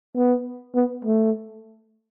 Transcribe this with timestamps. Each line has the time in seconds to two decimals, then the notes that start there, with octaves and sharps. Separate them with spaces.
0.16 B3
0.75 B3
1.05 A3